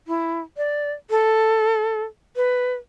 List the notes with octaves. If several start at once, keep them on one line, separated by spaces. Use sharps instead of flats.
E4
D5
A4
B4